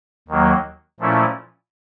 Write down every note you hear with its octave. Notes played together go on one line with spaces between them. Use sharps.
D#2 D#3 F#3 A#3
A#2 F3 A3 C#4 E4